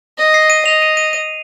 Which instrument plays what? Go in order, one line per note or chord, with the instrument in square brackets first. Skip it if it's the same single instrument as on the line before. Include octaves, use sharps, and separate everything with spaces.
[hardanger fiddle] D#5
[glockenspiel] C7
D#7
[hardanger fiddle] D#5 [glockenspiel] F7
[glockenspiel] D#7
D#7
D#7